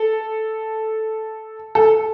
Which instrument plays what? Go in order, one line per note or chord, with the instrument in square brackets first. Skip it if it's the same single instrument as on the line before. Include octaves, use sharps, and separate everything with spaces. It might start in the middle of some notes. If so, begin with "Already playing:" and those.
Already playing: [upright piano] A4
A4